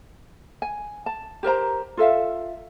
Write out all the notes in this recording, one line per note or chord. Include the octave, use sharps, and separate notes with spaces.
G#5
A5
G4 A#4 C5 A#5
F4 A4 E5 F5